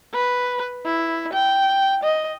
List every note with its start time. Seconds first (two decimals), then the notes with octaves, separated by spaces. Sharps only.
0.14 B4
0.85 E4
1.33 G5
2.03 D#5